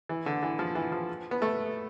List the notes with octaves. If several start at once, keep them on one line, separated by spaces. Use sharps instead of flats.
E3
D3
E3
F3
E3
F3
B3
A3